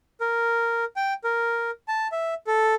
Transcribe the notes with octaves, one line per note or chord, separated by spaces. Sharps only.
A#4
G5
A#4
A5
E5
A4